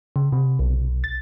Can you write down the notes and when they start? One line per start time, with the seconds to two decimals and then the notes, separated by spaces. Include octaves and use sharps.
0.16 C#3
0.32 C3
0.59 B1
1.04 A6